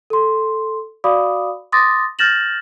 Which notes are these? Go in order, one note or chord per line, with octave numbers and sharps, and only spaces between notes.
A4 C6
F#4 D5 F5 B5 D6 D#6
C6 D6 D#6 A6 A#6
F6 G6 A6 A#6 E7 F#7